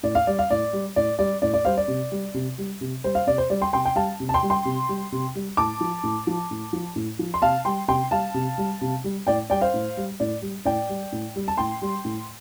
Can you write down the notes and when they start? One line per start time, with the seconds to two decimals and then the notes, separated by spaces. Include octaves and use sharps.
0.03 A2 D5
0.15 F5
0.27 G3 D5
0.39 F5
0.50 A2 D5
0.73 G3
0.96 A2 D5
1.19 G3 D5
1.42 A2 D5
1.54 D5
1.65 G3 C5 F5
1.77 D5
1.88 C3
2.12 G3
2.34 C3
2.58 G3
2.81 C3
3.04 G3 C5
3.15 F5
3.27 C3 D5
3.38 C5
3.50 G3 D5
3.61 G5 C6
3.73 C3 G5 C6
3.85 G5
3.96 G3 F5 A5
4.20 C3
4.29 A5
4.34 G5 C6
4.43 G3
4.50 G5 C6
4.65 C3
4.89 G3
5.12 C3
5.35 G3
5.57 A2 A5 D6
5.80 F3
6.03 A2
6.27 F3
6.51 A2
6.73 F3
6.96 A2
7.19 F3
7.34 C6
7.42 C3 F5 A5
7.65 G3 G5 C6
7.88 C3 G5 C6
8.11 G3 F5 A5
8.34 C3
8.58 G3
8.81 C3
9.04 G3
9.27 A2 D5 G5
9.50 G3 D5 G5
9.61 C5 F5
9.74 A2
9.97 G3
10.20 A2 D5
10.42 G3
10.65 A2 D5 G5
10.89 G3
11.12 A2
11.36 G3
11.48 A5
11.57 A2 G5 C6
11.82 G3
12.05 A2